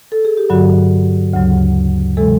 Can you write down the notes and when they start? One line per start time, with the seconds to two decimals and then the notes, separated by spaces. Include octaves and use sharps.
0.12 A4
0.25 G#4
0.37 G4
0.50 G2 D3 F#3 F#4
1.33 D2 C#3 F#3
2.17 C3 E3 G#3 A4